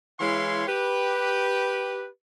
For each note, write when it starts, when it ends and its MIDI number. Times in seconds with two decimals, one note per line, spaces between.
0.20 0.62 52
0.20 0.62 56
0.20 0.62 64
0.20 0.62 73
0.20 0.62 77
0.20 0.62 84
0.67 2.06 67
0.67 2.06 71